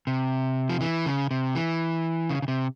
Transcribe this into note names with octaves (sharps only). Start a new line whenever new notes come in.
C3
F3
E3
C#3
C3
E3
C#3
C#3
C3